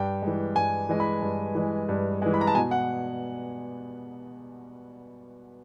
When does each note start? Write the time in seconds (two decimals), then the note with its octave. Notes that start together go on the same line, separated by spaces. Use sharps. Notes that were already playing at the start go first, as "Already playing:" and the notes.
Already playing: G2 G5
0.22 E3 G#3
0.56 G2 G#5
0.89 E3 G#3
1.00 B5
1.22 G2
1.55 E3 G#3
1.89 G2
2.22 E3 G#3
2.34 B5
2.41 A#5
2.47 A5
2.55 B2 G#5
2.71 F#5